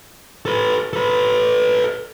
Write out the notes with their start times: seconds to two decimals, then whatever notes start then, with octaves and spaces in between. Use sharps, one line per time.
0.45 A4 B4
0.93 A4 B4